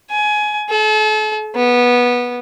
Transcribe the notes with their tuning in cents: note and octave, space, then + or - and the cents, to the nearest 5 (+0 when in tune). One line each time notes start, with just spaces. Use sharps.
G#5 +20
A4 -40
B3 -15